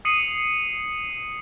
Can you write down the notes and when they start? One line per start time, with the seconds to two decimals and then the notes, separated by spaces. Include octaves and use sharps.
0.05 D#6 C7 C#7 D#7 F#7